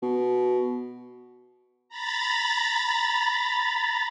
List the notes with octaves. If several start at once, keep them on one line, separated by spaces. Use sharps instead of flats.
B2
A#5 B5 A6